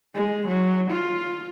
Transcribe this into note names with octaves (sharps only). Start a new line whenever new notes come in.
G#3
F#3
F4